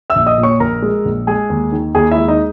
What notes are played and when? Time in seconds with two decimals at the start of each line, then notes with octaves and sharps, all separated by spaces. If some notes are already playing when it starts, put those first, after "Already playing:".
0.10 E5 E6
0.16 A#1
0.26 D#5 D#6
0.38 A#2
0.43 C#5 C#6
0.60 A#1 A#4 A#5
0.82 G#3
1.05 A#1
1.27 G#3 G#4 G#5
1.50 D#2
1.72 D#3
1.95 D#2 G#4 G#5
2.11 E4 E5
2.17 G#3
2.28 D#4 D#5